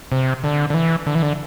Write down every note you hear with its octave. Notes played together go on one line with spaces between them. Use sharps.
C3
D3
D3
E3
D3
E3
D3